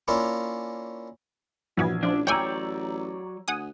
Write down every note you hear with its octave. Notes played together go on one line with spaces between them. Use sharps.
A#3 C#4 D4 E4 F4
A#1 E3 F#3 B3 G#6
A1 F3 D4
F#3 C#5 D5 G5 G#5 A#5 E6 G6
D2 F#5 G#5 D#6